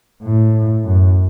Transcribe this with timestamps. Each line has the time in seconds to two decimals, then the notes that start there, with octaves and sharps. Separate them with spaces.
0.23 A2
0.84 F#2